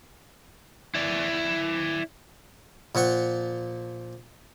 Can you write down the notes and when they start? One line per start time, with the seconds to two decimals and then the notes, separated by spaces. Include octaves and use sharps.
0.95 E4 D5
2.95 A#2 F3 F#5 C#6